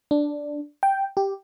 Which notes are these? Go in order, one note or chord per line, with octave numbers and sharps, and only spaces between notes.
D4
G5
G4